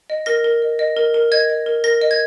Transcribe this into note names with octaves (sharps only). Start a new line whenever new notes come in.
D#5
A#4 A#6
A#4
D#5
D#5
A#4
A#4
D#5 G#6
D#5
A#4
A#4 A#6
D#5
G#6